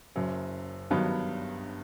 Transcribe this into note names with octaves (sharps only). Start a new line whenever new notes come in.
F#1 F#2 F#3
G1 G2 D#3 F#3 B3